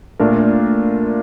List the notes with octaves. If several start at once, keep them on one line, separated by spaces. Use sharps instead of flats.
A#2 A3 D4 F4 A#4